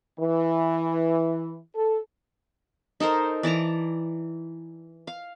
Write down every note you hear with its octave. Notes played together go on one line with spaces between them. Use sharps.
E3
A4
D#4 A4 A#4 C5
E3 D5 A5 A#5
F5